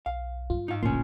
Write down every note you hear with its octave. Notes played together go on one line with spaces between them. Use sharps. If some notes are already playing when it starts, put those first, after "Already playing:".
B1 F5
G2 F4
G#2 D#4 F5
D#1 A#1 A2 D3 A#3 C#4 F4